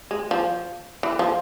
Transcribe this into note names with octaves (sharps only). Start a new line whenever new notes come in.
G#3
F3
E3
F3